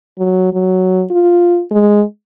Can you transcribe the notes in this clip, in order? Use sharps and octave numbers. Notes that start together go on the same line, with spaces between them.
F#3
F#3
F4
G#3